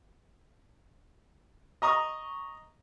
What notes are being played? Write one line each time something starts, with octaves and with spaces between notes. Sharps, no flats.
D#5 A#5 C#6 D#6